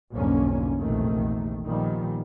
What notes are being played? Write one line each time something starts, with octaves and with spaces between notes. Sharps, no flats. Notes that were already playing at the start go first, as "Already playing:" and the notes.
B1 F2 G#2 D3 A#3 C#4
A#1 E2 C3 D#3 A3
A#2 D#3 F3 G3 B3